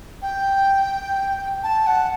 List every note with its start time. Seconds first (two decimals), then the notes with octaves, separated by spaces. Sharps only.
0.22 G5
1.63 A5
1.87 F#5